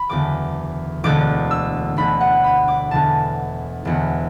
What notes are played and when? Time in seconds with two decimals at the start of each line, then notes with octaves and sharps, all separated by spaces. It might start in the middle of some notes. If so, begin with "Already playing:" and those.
Already playing: B5
0.09 F#1 E2 D3 D6
1.04 E1 D2 D3 D6
1.51 E6
1.97 E1 D2 D3 B5
2.21 F#5
2.44 B5
2.68 D6
2.91 E1 E2 D3 A5
3.85 E1 E2 D3